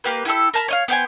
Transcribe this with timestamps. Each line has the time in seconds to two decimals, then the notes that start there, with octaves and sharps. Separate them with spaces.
0.04 A#3 G4 B4
0.25 E4 G4 A4 E6
0.54 A#4 A5 B5
0.68 C#5 D#5 F5
0.88 B3 C5 G5 G#5